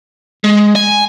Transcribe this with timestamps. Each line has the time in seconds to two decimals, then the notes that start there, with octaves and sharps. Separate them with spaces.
0.44 G#3
0.76 G#5